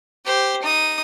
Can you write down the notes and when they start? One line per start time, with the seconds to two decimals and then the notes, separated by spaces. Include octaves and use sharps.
0.25 G4 C5
0.62 D#4 D#6